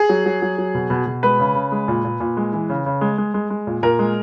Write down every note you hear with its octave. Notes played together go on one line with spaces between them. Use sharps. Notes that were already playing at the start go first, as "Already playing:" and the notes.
Already playing: G#4
F#3
F#3
F#3
F#3
B2
B2
B2
G#3 B4
C#3
C#3
G#3
A#2
A#2
A#2
G#3
E3
C#3
C#3
G#3
G#3
G#3
G#3
A#2
A#2 A#4
G#3